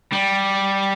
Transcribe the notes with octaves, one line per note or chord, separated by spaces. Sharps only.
G3